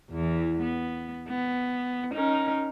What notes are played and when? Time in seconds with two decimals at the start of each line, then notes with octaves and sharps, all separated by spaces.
0.11 E2 E3
0.62 B3
1.29 B3
2.14 C#4 D#4 A#4